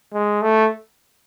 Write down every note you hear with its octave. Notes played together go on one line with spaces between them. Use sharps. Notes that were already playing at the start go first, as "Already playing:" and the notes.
G#3
A3